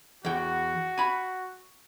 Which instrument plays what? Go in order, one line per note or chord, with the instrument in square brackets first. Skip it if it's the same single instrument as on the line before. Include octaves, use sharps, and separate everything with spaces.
[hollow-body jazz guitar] E2 G5 [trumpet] F#4
[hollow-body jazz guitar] G#5 B5